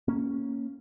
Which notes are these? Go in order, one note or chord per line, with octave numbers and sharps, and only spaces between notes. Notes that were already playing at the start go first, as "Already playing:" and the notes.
A#3 C#4